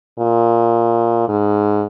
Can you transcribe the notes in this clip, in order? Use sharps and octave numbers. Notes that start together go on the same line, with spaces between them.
A#2
G#2